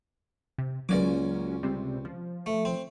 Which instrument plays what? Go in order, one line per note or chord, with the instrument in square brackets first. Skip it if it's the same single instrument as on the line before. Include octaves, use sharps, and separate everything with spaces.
[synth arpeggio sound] C3
[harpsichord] C#2 D5 D6 [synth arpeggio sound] F#3 A#3 C#4
[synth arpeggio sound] C3 G3 C4
F3
[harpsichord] A3
C4